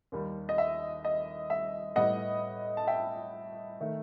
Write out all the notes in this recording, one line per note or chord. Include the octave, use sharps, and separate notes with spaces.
D#2 D#3 G3
D#5
E5
D#5
E5
A2 G3 B3 D#5 F#5
A5
E5 G5
D#3 A3